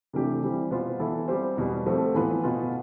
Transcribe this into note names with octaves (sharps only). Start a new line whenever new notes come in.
C3 E3 A3 D4 G4
E3 G3 C4
B2 B3 F4 C5
E3 B3 E4 A4
G3 C4 G4 C5
E2 B2 G3 B3
F3 A3 C4
A2 E3 B3 F4 B4
B2 B3 F4